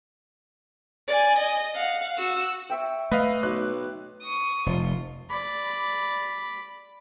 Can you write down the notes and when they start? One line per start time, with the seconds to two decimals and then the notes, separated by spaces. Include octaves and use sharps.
1.08 D5 G#5
1.39 D#5
1.74 F5 F#5
2.18 F#4 E6
2.70 C#5 E5 G5
3.12 A3 B4 D#5 F5
3.43 B1 F#6
4.22 C#6 D#6
4.66 F1 F4
5.30 D5 B5